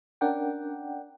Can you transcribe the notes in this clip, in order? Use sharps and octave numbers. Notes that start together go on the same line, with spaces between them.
C#4 D4 A#4 D5 F#5 G5